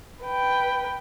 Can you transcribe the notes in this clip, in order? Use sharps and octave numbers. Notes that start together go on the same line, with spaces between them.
B4 G5